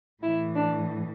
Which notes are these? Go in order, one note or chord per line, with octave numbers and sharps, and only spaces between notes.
A2 E3 E4
D4